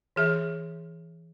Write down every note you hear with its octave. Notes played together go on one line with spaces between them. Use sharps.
E3 G#4 E5